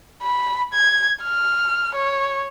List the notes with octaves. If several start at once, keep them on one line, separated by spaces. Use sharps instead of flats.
B5
G#6
F6
C#5